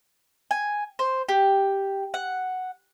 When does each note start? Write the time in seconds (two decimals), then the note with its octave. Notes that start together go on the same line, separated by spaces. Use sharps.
0.51 G#5
0.99 C5
1.29 G4
2.14 F#5